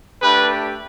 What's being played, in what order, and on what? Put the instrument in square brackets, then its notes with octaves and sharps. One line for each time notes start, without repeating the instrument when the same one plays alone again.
[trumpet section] A3 D4 G4 B4